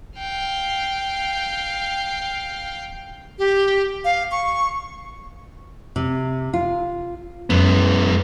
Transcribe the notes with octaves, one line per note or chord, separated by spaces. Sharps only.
F5 G5
G4
F5
C#6
C3
F4
F#2 G#3 B3